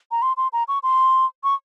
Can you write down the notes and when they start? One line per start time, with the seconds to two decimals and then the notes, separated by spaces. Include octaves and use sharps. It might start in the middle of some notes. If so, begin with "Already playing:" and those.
0.11 A#5
0.22 C6
0.37 C6
0.53 A#5
0.68 C#6
0.83 C6
1.44 C#6